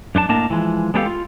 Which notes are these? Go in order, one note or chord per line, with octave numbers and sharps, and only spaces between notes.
F#2 D4 F4 A5
A2 A#3 D4 A#4 D#5 A5
E3 F3 G#3
G#3 B3 D4 G4 A4 F5
F4